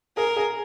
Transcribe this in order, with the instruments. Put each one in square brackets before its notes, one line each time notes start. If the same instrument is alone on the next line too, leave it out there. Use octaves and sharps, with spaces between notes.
[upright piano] G#4 [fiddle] A#4
[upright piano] G#4